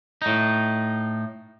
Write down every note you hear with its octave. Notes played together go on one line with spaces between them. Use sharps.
A2 D#4